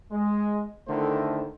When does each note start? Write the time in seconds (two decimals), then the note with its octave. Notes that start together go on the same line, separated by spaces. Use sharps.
0.11 G#3
0.88 D3 D#3 A3 E4 A#4 C5